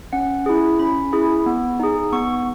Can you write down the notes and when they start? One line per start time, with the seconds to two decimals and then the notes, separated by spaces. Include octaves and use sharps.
0.13 C#4 F#5
0.46 E4 G#4
0.79 C#4 B5
1.12 E4 G#4
1.46 B3
1.80 D#4 G#4
2.13 B3 C#6